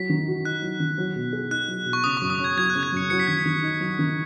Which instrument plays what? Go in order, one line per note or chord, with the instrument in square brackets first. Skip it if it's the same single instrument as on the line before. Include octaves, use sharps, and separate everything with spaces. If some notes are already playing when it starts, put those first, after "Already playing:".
Already playing: [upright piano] F#3 [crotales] B6
[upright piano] D#3
F#4
[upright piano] D#4 [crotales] F#6
[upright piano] F#3
D#3
F#3
B2
G#4
[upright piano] D#4 [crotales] F#6
[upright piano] F#3
B2
[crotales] C#6
[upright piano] C#3 [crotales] D#6
[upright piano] F#2 [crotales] C#6
[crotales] D#6
[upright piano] C#4
[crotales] G#6
[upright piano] F#3 [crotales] G#6
[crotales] F#6
[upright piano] C#3
[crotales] G#6
[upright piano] F#2 [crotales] C#7
[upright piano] F#3 [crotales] C#7
[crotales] B6
[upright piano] D#3 [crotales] G#6
[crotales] B6
[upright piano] D#3
D#4
F#3
D#3